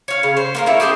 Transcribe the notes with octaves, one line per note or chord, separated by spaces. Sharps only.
C#5 F5
C#3
C5
A#3 A4 A#4
A3 A#3 E4 C#5
G4 G#4 C5 A5